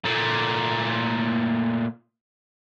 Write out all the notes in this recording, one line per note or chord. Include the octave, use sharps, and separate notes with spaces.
A#2 A3